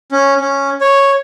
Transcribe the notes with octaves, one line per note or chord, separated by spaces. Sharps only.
C#4
C#4
C#5